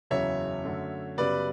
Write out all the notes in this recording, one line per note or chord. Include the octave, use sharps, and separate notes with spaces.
F#1 E2 C#3 F#3 C#5 E5
F#2 D3 A3
F#2 C#3 G3 B3 B4 D5